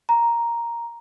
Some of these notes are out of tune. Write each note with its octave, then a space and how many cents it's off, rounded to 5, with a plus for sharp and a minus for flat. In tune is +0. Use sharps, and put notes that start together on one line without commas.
A#5 +5